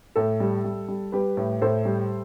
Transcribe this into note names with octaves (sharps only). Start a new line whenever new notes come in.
A2 A4
G3
G3
G3
G3 G4 B4
A2
A2 A4 C5
G3